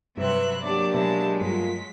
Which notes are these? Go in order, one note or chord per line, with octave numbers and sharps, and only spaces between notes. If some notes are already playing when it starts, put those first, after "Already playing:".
G2 C3 F#3 C4 B4 E5 F#6
F#3 A#3 D4 G4 D5 A5
B2 F#3 G#3 E4 A5
G2 A3 A#3 F4 B6